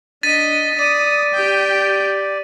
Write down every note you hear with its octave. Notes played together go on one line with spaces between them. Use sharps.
D4 D#5 A6 B6 D#7
D5 D#6 D#7
G4 G5